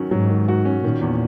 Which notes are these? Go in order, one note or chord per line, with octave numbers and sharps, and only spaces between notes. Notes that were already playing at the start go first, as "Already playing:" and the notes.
Already playing: D#3 F#3 C#4 F#4
G#2 F#3
D#3
F#4
C#4
A#2 D#3
E2